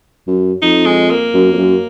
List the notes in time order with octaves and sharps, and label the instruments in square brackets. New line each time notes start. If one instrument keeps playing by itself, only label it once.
[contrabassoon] F#2
[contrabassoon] F2 [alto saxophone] D#4
[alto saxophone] G#3
A#3
[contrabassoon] F#2
F2
F#2